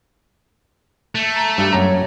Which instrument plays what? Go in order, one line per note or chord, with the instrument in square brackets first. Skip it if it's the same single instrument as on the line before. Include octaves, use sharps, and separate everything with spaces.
[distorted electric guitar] A3
[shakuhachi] A#5
[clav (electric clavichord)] G2 [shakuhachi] G4
[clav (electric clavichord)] F#2 A#5 [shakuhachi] C#5